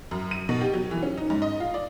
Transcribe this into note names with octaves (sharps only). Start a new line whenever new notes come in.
F#2
D#7
B2
G4
F#3
E3
C#4
D#4
G#2
D#5
F4
D5